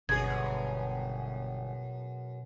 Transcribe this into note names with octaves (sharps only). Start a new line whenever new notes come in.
G1 F#2 B2 G#4 G#6